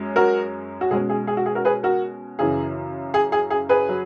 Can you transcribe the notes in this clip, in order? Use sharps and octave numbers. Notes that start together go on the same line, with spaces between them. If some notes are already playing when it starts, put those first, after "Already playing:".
Already playing: F#2 G#3 C#4
F#4 A#4
F#4
B2 G#3 C#4 G#4
G#4
G#4
F#4
G#4
F#4 A#4
G#4 B4
F#4 A#4
F#2 C#3 E3 G#4
G#4
G#4
G#4
G#4 B4
F#3